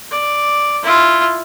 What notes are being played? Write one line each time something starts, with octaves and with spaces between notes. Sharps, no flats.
D5
E4 F4